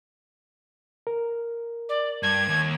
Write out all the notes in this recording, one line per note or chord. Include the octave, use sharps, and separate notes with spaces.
A#4
D5
G2 G#6
D#2